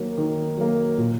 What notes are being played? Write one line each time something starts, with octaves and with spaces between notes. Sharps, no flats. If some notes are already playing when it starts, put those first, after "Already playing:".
Already playing: D#3 F#3 A#3
D#3
F#3 A#3
A#2